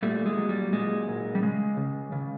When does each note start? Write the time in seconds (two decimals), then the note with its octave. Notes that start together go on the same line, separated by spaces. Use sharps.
0.03 A#2 G3 A3
0.26 G#3
0.38 F#3
0.49 G3
0.73 A#2 G#3
1.08 A#2
1.35 G3
1.42 C#3 G#3
1.77 C#3
2.12 C#3